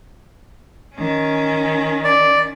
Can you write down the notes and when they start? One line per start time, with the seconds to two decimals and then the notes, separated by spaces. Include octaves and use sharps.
0.95 D#3 C#4
2.04 D5